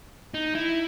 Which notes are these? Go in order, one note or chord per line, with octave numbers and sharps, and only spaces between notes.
D#4
E4